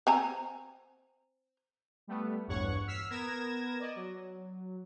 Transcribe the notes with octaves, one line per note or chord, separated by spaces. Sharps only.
C4 G#5 A#5
G3 A3 B3
A#1 E2 G2 C#5 F#5 C#6
E6 F6 B6 C7
B3 A#4 G#6 A#6 E7
D5 D#5
F#3